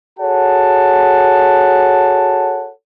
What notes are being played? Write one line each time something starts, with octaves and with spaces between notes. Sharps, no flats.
F#4 G#4 A4 C#5 F#5 A5